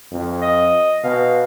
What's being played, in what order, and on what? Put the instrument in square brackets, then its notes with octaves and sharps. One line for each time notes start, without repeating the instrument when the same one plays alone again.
[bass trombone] F2
[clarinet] D#5
[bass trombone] B2 [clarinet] F5